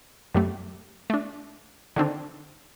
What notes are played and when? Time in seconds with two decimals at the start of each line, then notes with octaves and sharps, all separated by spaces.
0.34 F#2 G3 A3
1.10 A3 D4
1.96 D3 D#3 C4 D4